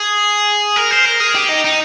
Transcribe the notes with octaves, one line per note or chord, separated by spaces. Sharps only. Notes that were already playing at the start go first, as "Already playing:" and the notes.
Already playing: G#4
A#4
C5
A#4
G#4
G4
D#4
D#4